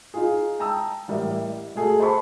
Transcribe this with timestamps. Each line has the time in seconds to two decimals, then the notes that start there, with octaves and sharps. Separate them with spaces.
0.14 D#4 F4 G#4
0.59 G5 A5 A#5 D#6 E6
1.08 A1 G3 A#4 E5
1.75 A3 F#4 G#4 A4
2.00 C5 A5 B5 C#6